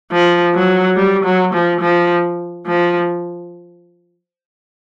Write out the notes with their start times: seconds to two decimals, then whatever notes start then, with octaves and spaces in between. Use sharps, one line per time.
0.12 F3
0.54 F#3
0.96 G3
1.24 F#3
1.53 F3
1.81 F3
2.66 F3